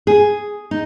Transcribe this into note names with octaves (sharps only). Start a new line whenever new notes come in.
G#4
D#4